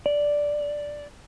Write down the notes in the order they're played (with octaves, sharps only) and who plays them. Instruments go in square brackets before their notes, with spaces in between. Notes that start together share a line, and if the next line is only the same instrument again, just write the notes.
[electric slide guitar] D5